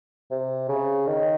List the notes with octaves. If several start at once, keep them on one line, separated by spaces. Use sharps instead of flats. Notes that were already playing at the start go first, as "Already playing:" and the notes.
C3
C#3
D#3